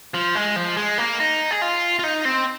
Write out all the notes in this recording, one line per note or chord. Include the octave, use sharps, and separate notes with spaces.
F3
G#3
F3
G#3
A#3
D#4
G#4
F4
F4
D#4
C4